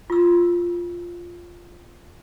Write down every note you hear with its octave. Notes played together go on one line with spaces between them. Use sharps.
F4 E6